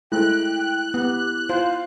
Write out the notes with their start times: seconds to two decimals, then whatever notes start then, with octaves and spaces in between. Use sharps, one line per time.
0.12 G#3 A3 E4 C5 G5 F#6
0.94 B3 G4
1.49 F4 C5 F5